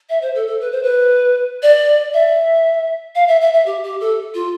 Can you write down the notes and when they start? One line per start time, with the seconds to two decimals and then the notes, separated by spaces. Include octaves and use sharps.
0.09 E5
0.22 C5
0.35 A4
0.47 A4
0.61 B4
0.72 C5
0.83 B4
1.63 D5
2.14 E5
3.15 F5
3.28 E5
3.41 E5
3.53 E5
3.66 G4
3.84 G4
4.01 A4
4.34 F4